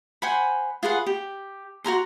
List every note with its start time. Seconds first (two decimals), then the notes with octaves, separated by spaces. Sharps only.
0.22 C5 F#5 G#5 B5
0.83 F4 G#4 B4 F#5
1.06 G4
1.84 F#4 A#4 A#5 C6